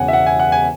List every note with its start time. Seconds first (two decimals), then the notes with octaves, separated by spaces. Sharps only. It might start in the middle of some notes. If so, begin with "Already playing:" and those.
Already playing: E1 E2 C#3 F#5 G#5
0.08 E5
0.13 F#5
0.26 G#5
0.40 F#5
0.52 G#5